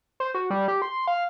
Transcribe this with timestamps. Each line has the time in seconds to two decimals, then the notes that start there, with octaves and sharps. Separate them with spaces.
0.20 C5
0.34 F#4
0.50 G3
0.68 G4
0.82 C6
1.07 F5